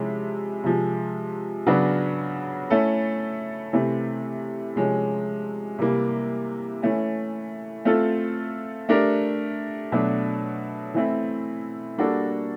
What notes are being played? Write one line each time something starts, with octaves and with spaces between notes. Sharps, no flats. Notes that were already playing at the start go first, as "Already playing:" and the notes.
Already playing: C3 F3 G#3 C#4 E4
C3 F3 G#3
C#3 F#3 B3 D4 F#4
A3 C#4 E4 A4
C3 E3 A3 C4
C3 F3 G#3 C#4
C3 E3 G3 A#3
E3 A3 C#4
A3 C4 F4 A4
A3 D4 G4 A#4
B2 F#3 A3 D4
E3 A3 C4 E4
G3 A#3 D4 F#4 A4